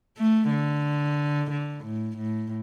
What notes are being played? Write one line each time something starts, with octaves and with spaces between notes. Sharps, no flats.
A3
D3
D3
A2
A2